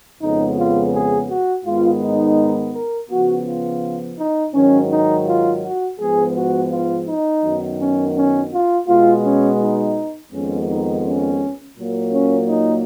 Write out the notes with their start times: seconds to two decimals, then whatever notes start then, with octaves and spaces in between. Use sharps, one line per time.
0.21 F2 C#3 G#3 B3 D#4
0.56 F4
0.92 G#4
1.28 F#4
1.64 G#2 D#3 G#3 B3 F4
2.01 D#4
2.73 A#4
3.09 C#3 F3 B3 F#4
3.45 F4
4.17 D#4
4.53 G#2 D#3 F#3 C#4
4.90 D#4
5.26 F4
5.62 F#4
5.98 G#2 F3 G#3 B3 G#4
6.34 F#4
6.70 F4
7.07 D#4
7.43 F#2 D#3 F#3 B3
7.79 C#4
8.15 C#4
8.52 F4
8.87 B2 G#3 B3 F4
9.24 C#4
9.60 D#4
10.32 F2 D#3 G#3 B3 C#4
10.68 D#4
11.04 C#4
11.77 A#2 F#3 A#3
12.12 C#4
12.48 D#4